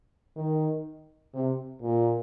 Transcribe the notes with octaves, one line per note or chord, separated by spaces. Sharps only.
D#3
C3
A#2